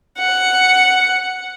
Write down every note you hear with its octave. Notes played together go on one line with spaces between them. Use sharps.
F#5